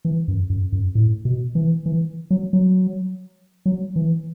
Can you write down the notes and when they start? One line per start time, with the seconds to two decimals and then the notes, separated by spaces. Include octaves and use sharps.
0.05 E3
0.28 F#2
0.50 F#2
0.72 F#2
0.95 A2
1.25 B2
1.55 E3
1.86 E3
2.31 F#3
2.53 F#3
3.66 F#3
3.96 E3